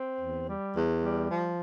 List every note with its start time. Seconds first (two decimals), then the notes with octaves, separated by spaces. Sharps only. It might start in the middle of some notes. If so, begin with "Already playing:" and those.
Already playing: C4
0.20 E2
0.48 G3
0.74 E2
1.02 G3
1.30 F3